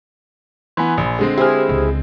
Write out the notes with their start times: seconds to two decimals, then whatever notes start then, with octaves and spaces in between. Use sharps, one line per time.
0.77 E3 B3 G#5 B5 C6
0.97 A#1
1.19 D3 G#3 C4
1.37 E4 G4 G#4 C5 F6
1.69 C#2